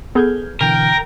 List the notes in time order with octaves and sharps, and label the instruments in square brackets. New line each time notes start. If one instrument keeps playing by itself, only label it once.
[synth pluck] B3 G#4 A4 [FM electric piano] F6 G6 G#6
[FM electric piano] B2 D3 E3 [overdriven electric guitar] A#4 [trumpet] G5